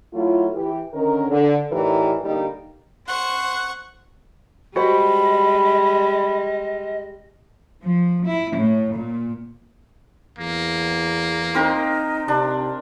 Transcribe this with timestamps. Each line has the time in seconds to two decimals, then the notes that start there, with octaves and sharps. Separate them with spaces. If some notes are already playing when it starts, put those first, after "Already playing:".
0.13 F#3 A3 E4 F4
0.55 E3 G4
0.94 D3 D#3 C#4 A#4
1.30 D3
1.71 A2 E3 D#4 G4 A#4 D5
2.23 D3 G3 A#3 D#4
3.08 C5 F#5 C#6 F#6
4.76 G3 G#3 F#4 C5 D#5 B5
7.83 F3
8.26 E4
8.56 A2
8.95 A#2
10.38 E2 A#3
11.54 C4 D#4 A#4 C5
12.28 C3 D4